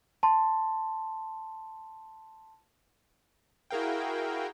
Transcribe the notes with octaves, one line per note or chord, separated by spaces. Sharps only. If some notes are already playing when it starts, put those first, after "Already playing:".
A5 C6
E4 F#4 G#4 A#4 F5 G5